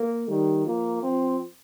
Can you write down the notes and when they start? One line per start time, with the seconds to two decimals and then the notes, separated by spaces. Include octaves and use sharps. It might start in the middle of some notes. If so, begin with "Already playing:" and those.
Already playing: A#3
0.28 D#3 G3
0.65 F3 A#3
1.03 F3 C4